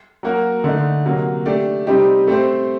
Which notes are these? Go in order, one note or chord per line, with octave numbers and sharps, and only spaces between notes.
F#3 A#3 F#4 A#4
D3 A3 D#4
C3 F#3 A#3
A3 D4 G4
C3 G3 C4 D#4 G4
A3 C4 G4 C5